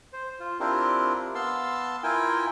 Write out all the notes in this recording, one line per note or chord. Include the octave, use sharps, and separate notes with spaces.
C5
F4
C4 D4 E4 F4 G4 A#4
B3 F5 A5 C6 E6
E4 F4 A#4 G5 G#5